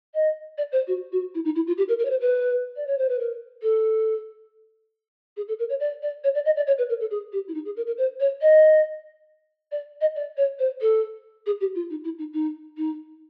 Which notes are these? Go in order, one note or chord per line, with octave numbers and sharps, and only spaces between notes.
D#5
D5
C5
F#4
F#4
E4
D#4
E4
F4
G4
A#4
A#4
C#5
C5
B4
D5
C#5
C5
B4
A#4
A4
G#4
A4
A#4
C#5
D5
D5
C#5
D5
D#5
D5
C#5
B4
A#4
A4
G#4
G4
E4
D#4
G#4
A#4
A#4
C5
C#5
D#5
D5
D#5
D5
C#5
C5
A4
G#4
G4
F4
D#4
E4
D#4
D#4
D#4